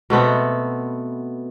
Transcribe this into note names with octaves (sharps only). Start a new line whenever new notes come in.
B2 A3 B3 C4